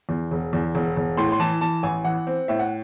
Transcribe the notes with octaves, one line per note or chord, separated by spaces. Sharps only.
E2
E1
E2
E1
E1
A2 C6
C6
E3 A5
E3 A5
A1 G#5
E3 F#5
C4
A2 E5
F#5